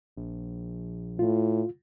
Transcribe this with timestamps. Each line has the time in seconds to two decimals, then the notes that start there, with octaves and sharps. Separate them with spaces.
0.17 A#1
1.19 A2 F4